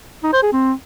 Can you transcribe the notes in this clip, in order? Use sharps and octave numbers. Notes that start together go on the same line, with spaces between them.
D#4
C5
G#4
C4